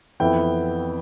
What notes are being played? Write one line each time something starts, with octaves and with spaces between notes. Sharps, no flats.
F2 E3 B3 E4 G5